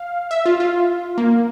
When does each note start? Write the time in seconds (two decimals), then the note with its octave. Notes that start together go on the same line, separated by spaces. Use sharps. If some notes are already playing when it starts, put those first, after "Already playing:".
Already playing: F5
0.31 E5
0.46 F4
0.60 F4
1.18 A#3